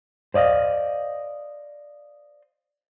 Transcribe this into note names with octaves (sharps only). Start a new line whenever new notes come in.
C5 D5 D#5 F5